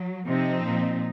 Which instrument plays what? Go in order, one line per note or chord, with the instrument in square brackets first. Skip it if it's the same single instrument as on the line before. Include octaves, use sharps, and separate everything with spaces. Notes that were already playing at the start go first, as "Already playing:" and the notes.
Already playing: [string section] F#3
[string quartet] C3 [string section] F3 C4 D#4
[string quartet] A#2